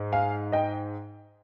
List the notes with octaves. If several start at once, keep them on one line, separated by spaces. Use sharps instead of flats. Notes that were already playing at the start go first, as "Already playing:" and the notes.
Already playing: G#2
F5 G#5
D#5 G5